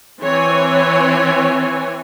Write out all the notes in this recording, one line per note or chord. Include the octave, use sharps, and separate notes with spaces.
E3 C4 C#5 G#5